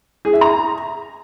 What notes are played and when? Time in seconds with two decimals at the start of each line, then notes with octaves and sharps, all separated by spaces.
0.25 G#4
0.33 E5
0.41 A#5